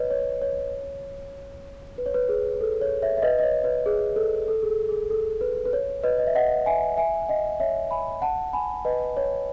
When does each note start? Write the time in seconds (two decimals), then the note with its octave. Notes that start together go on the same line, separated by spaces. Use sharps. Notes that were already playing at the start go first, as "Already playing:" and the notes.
Already playing: B4 C#5 D#5
0.11 C#5
0.42 C#5
1.98 B4
2.06 C#5
2.14 B4
2.29 G#4
2.61 A4
2.81 C#5
3.02 C#5 E5
3.17 E5
3.22 B4 D#5
3.39 D#5
3.43 C#5
3.64 B4
3.86 G#4
4.16 A4
4.48 A4
4.63 G#4
4.69 A4
4.89 G#4
5.10 A4
5.41 B4
5.65 B4
5.73 C#5
6.03 B4 D#5
6.19 D#5
6.27 E5
6.35 D#5 F#5
6.66 E5 G#5
6.97 E5 G#5
7.28 D#5 F#5
7.60 C#5 E5
7.91 G#5 B5
8.22 F#5 A5
8.53 G#5 B5
8.85 B4 D#5
9.17 C#5